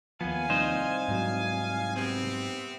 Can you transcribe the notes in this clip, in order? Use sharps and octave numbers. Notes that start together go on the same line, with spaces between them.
D#2 F3 B3 F5 G#5
C2 D#4 C5
G#2 F#3
C3 B3 C4